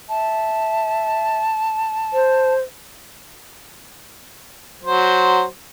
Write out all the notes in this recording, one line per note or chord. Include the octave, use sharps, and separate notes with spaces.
E5 A5
C5
F#3 C5